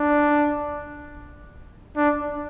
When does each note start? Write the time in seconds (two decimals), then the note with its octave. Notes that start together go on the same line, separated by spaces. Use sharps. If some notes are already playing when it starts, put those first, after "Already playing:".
Already playing: D4
1.97 D4